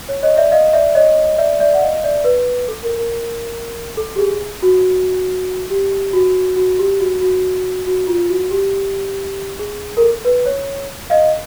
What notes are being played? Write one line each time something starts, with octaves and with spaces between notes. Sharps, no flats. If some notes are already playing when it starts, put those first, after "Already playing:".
C#5
C#5 D#5
D5 E5
D#5 F5
D5 E5
C#5 D#5
D5 E5
D5 E5
F#5
D#5 F5
D5 E5
B4
A4
A#4
A#4
A4
G4
G#4
F#4
G4
F#4
F#4
G4
F#4
F#4
F#4
F4
F#4
G4
G#4
A#4
A4
B4
C#5
D#5 F5